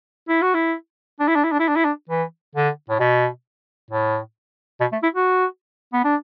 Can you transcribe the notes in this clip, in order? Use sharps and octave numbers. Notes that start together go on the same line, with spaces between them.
E4
F#4
E4
D4
E4
D4
E4
D4
E4
D4
E4
D4
E3
D3
A2
B2
A2
B2
A3
E4
F#4
B3
D4